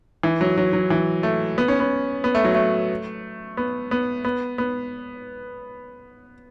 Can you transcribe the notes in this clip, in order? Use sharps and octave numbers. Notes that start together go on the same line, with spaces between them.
E3
F#3
F#3
F#3
E3
A3
B3
C#4
B3
B3
A3
F#3
A3
B3
B3
B3
B3